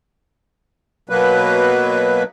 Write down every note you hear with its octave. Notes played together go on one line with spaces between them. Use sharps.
B2 F#3 A#3 B4